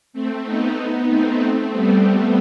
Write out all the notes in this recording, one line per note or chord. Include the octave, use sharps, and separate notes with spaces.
A3 C4
B3 D#4
A3 C4
G3 B3